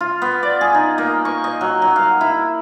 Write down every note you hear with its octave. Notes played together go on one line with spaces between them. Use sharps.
F4
B3
D5
G#4
D#4
A#3
C#6
D#5
F#3
F#3
F5
E4